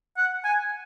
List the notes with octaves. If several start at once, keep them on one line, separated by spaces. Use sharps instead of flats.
F#5
G#5